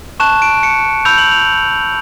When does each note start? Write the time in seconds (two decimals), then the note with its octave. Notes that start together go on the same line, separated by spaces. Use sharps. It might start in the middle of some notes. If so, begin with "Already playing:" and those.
0.20 A5 C#6 F#6 E7
0.42 D7
0.63 C#7
1.05 B5 E6 G6 F7
1.18 F#7
1.31 F7